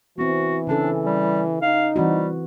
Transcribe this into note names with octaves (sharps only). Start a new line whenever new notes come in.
E3 B3 C4 F#4
C#3 C#4 D4 A4
G3
D#4 F5
E3 G3 C4 F#4